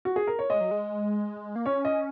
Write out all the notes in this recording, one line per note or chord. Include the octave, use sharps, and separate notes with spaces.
F#4
G#4
A#4
C#5
G#3 D#5
F#3
G#3
A#3
C#4 C#5
D#5